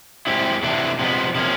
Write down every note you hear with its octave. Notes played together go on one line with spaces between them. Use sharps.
G#3 C4 E4 G4
C3 E3 A3 D4
C3 F3 G#3 B3
C3 F3 A#3 C#4